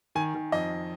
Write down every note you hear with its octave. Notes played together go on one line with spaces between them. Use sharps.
D#3 G#5
D#3
F2 D#5